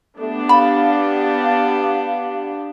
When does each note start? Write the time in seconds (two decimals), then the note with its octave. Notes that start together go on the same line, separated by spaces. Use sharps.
0.18 A3 B3 D4 G4
0.49 F5 B5